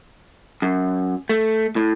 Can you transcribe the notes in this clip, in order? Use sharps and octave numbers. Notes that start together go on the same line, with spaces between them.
F#2
A3
A2